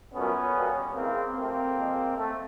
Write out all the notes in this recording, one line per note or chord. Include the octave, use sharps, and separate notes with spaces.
A#2 F#3 A3 B3 C#4
B2 G3 A#3
C#3 E3 G#3 A#3 C4
C3 F3 A3 A#3 C4
A#2 F3 G#3
A3